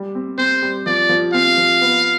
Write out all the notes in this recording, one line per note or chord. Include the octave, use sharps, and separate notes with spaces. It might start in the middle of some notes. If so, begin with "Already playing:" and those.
Already playing: G3
C4
C4 C5
G3
F3 D5
F3
C4 F5
F3
B3